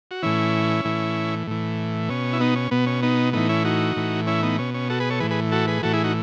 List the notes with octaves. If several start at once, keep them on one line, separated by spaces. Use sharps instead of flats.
F#4
A2 E3 C#4 E4
A2 E3
A2 E3
B2 C#4
E4
B3 D#4
C#4
B2 B3
C#4
B3 D#4
A2 E3 B3 D#4
C#4 E4
D#4 F#4
A2 E3
C#4 E4
B3 D#4
B2 C#4
C#4
F#4 A4
G#4 B4
A4 C#5
A2 E3 G#4 B4
G#4 B4
F#4 A4
G#4 B4
A2 E3 F#4 A4
E4 G#4
D#4 F#4